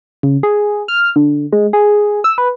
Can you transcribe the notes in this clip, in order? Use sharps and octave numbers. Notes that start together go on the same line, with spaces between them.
C#3
G#4
F6
D3
G#3
G#4
E6
B4